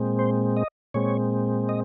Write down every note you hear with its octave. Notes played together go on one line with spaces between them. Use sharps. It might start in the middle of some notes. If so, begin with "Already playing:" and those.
Already playing: A#2 G#3 C4
C5
D#5
A#2 G#3 C4 C#5
D#5